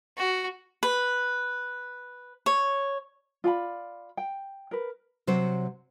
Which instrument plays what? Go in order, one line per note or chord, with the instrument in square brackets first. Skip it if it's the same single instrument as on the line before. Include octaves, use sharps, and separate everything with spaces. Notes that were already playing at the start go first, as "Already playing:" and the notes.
[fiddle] F#4
[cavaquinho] B4
C#5
[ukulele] F4 D5 G5 B5
G5
A#4 B4
[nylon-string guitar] C3 F#3 C5